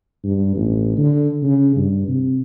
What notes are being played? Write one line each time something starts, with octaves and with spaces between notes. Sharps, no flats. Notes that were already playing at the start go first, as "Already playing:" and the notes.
G2
A1
D3
C#3
G2
C3